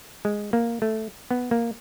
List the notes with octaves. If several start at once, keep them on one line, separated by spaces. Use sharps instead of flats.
G#3
A#3
A3
B3
A#3